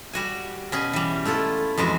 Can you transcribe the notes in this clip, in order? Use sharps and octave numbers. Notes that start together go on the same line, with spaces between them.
G3 F#4 G#5
B2 C#4 G#4 G#5
E3 G3
A3 E4 F4 A4
F2 E3 G#3 F#4